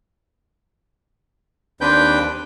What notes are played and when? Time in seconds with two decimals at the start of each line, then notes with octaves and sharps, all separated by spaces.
1.81 D#2 C4 D4 B4 G5 G6